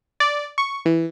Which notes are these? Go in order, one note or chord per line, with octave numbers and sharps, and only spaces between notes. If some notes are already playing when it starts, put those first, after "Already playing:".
D5
C#6
E3